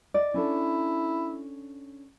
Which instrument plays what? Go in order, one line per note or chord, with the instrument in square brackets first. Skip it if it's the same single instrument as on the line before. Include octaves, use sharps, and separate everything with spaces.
[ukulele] D5 [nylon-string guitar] D#5
[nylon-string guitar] C#4 D4 A4 [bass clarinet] E4